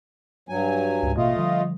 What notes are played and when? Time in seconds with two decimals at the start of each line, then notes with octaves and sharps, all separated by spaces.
0.49 G2 F#3 G#5
1.03 C#2 G#2
1.17 A1 B2 A3 A#3 F4 D#5
1.36 D3 F3 G3